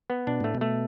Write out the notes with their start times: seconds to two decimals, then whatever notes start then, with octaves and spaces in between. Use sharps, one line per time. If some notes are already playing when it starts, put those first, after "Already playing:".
0.10 B3
0.27 B2 D4
0.40 A2 A3
0.55 B2
0.61 A3